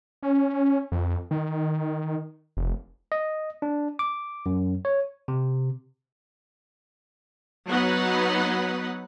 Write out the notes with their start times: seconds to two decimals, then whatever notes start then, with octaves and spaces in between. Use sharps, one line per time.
0.23 C#4
0.92 F2
1.31 D#3
2.57 F1
3.12 D#5
3.62 D4
3.99 D6
4.46 F#2
4.85 C#5
5.28 C3
7.68 F#3 B3 D#4 B4 F#5